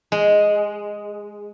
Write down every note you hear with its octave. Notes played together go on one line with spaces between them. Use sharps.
G#3